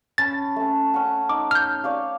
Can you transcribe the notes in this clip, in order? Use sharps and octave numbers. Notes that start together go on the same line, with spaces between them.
C#4 A5 B5 A6
A3 C#4
C#4 F#5
D#4 D6
F6 G6
C#5 D5 F5